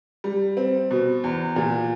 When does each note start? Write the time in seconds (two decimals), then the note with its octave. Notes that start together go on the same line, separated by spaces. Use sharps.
0.24 G3
0.57 C4
0.91 B2
1.24 E2
1.56 A#2